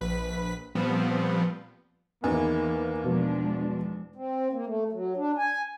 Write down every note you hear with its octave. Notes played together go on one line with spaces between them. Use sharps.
A#1 B4 B6
A#2 F3 G3 B3 C4
E2 D#3 E3 A#3 G#5
B2 F3 G#3 D4
C4
A#3
A3
F#3
D4
G#5